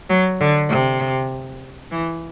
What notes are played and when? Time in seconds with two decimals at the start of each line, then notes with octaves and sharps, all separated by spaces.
0.10 F#3
0.41 D3
0.70 C3
1.92 E3